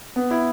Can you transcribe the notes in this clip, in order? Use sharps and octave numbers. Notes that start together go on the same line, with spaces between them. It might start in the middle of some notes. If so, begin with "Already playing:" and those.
B3
E4